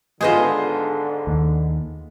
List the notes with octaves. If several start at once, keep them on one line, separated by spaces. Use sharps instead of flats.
G#2 D3 G#3 B3 F4 G#4 C5 D#5
D#2